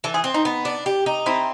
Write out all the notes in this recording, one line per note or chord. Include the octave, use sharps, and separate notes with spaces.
E3 A4
G#4
C4
D#4
B3
D4
G4
D#4
C4 E4